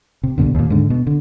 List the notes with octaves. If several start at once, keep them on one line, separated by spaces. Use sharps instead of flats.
C3
C2 G2 B2 D3
D#2 A#2
G#2 D3
B2
D3